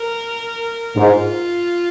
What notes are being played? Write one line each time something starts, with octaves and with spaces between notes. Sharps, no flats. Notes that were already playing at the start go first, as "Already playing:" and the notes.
Already playing: A#4
G#2 F4